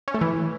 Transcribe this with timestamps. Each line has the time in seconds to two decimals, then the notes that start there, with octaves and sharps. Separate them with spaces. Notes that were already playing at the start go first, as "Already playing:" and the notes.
0.08 C#4
0.14 A3
0.21 E3